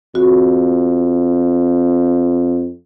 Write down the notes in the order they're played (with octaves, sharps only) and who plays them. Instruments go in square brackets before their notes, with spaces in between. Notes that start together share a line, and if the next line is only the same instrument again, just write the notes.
[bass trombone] F2 [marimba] F#4